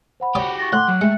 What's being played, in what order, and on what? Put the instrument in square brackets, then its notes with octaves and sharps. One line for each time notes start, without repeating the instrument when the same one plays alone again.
[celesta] C5 F#5 B5
[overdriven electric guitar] F#4 G4 [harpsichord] C#5 D5 D#6
[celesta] C#6 A6 A#6
[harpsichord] A2 [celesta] F#5 G5 D6 [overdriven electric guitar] C6 [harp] F#6
[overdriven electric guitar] F#3
[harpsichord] G#3 [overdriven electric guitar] A3 [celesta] E5 G5 C#7